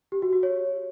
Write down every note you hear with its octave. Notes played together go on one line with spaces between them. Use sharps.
G4
F#4
F#4
C#5